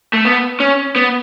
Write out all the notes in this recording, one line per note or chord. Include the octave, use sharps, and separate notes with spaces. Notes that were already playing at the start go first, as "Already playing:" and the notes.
A3
B3
C#4
B3